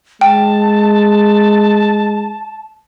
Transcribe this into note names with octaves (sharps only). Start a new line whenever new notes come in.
G#3 G5 A5